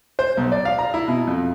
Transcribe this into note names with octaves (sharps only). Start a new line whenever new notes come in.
C5
B1
D5
F5
A#5
E4
B2
F2